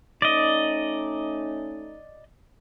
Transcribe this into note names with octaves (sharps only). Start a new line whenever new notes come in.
A3 C#4 D#4 D5 D#5